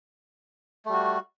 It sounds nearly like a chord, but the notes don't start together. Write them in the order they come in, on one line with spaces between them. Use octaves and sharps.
A3 G3 F#4